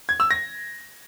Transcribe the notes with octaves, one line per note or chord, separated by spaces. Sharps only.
G#6
E6
A#6